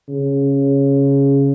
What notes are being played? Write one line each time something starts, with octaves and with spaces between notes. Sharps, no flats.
C#3